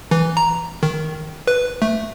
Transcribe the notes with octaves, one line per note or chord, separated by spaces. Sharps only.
E3
A#5
D#3
B4
A3